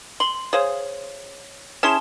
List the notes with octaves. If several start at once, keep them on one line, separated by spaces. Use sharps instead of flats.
C6 F#7
G#4 C5 C#5 F5
C#4 E4 G#4 A5 C6 E7